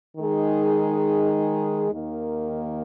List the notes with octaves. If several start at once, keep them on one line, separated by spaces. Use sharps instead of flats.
D#3 G#3 D#4 G#4
D#2 D#3 A#3